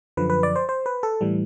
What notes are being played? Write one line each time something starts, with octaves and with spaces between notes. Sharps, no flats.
F#2 D3 F3 B4
B4
D5
C5
C5
B4
A4
A2 E3 G3